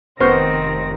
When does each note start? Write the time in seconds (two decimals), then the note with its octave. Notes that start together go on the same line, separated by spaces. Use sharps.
0.20 F1 D#3 B3 C4 C5 C#6 F6 A#6